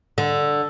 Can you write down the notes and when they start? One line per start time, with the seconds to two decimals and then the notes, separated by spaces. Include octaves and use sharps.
0.18 D3